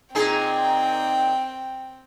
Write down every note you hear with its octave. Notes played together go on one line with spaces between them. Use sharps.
A#2 C4 D#4 G#4 G5